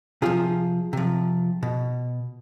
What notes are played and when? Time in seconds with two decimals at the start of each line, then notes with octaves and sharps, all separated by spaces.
0.22 C3 F3 F4 G#4
0.93 C3 F3
1.63 B2